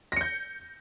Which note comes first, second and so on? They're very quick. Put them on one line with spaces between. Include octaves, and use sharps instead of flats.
A#6 C#7 G6